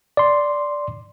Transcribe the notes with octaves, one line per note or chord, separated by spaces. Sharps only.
D5 C6